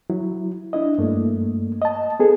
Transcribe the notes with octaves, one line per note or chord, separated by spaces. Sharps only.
F#3 E4
D4 E4 D#5
G2 A3 A#3
D#5 A5
B3 G#4 A4